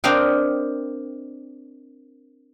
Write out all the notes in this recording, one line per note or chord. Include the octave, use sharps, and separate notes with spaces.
C4 D4 A#4 D#5 F5 G5